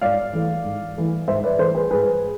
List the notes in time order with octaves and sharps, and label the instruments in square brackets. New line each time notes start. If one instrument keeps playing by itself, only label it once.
[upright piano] G#2 D5 F5
E3 A3
G#2
E3 A3
G#2 C5 E5
B4 D5
E3 A3 A4 C5
G#4 B4
G#2 G#4 B4